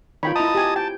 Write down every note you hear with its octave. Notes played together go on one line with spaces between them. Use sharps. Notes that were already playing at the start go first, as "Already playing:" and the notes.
D#3 F4 C#5 G5 B5
E4 D#5 A5 A#5 D#6
G4 G#5
G5 A5